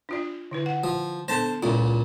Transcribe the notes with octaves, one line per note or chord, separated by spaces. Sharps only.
D4 F4 D5
D3 E4 B4
F#5
F3
B3 D4 A4 C5 A5
C#2 A#2 E4